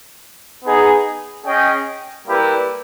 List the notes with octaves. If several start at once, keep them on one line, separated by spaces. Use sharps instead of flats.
B3 D#4 G#4
C#4 G#4 D#5 G5
G3 A#3 E4 G4 B4